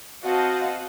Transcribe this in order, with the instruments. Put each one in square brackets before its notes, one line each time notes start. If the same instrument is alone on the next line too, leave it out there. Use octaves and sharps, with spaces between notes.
[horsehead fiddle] C4 F5 [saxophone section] F#4 [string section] D#5 F#5 A5